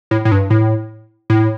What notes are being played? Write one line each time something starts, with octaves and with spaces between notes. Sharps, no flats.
A2
A2
G2
A2
A2